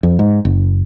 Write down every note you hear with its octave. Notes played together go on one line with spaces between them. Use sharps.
F2
G#2
F#1